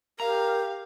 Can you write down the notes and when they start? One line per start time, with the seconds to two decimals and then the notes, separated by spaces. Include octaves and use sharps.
0.20 G4 A#4 F5 A#5